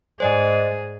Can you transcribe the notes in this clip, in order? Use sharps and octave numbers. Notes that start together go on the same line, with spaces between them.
G#2 G#4 C5 D5 D#5